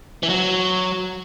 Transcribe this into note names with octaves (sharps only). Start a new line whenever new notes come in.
E3
F#3